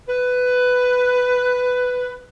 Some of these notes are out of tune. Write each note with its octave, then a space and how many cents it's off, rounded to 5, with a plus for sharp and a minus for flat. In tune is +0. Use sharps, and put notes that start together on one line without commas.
B4 +10